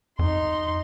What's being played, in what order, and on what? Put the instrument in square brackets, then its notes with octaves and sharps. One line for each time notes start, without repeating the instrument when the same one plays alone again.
[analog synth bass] F2 [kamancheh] D#4 C6